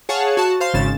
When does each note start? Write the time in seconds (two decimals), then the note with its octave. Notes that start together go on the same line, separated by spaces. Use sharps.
0.09 G#4 C#5 F5 F#5 A5 C#6
0.37 F#4 A5
0.60 C5 F5 C6
0.74 G#1 C#3 A6 E7